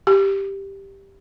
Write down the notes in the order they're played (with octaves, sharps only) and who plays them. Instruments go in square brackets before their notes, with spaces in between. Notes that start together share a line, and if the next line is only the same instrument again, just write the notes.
[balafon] G4